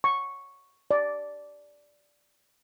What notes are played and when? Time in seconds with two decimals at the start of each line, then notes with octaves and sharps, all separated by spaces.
0.04 C#6
0.91 D5